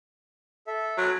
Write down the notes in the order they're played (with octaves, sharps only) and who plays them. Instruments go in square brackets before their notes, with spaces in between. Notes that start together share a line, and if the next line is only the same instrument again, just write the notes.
[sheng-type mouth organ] A4 E5
[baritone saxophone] F#3